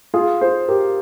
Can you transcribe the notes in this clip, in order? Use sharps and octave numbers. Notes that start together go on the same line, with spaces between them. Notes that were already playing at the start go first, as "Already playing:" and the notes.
F4 G#4
G#4 C5
G4 A#4